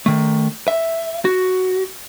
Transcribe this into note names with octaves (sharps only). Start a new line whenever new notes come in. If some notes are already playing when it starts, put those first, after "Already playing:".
D#3 A3
E5
F#4